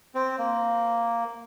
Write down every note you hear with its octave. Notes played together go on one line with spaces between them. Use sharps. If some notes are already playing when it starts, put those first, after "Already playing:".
C4
A#3